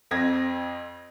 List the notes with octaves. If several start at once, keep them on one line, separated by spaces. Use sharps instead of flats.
F2 C4 G#6 A#6